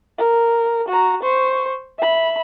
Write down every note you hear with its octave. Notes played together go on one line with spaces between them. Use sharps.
A#4
F#4 A#5
C5 C#6
E5 B5